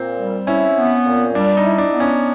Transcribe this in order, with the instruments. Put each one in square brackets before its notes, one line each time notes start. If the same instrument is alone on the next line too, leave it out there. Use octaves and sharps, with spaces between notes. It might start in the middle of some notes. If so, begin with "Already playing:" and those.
Already playing: [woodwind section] A#2 [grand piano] C4
[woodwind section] G3
[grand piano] C#4 [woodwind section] E4
[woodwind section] B3
A#2
[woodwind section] G3 [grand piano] D4
[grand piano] D#4
[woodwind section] E4
[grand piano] D4
[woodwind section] B3
[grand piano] C#4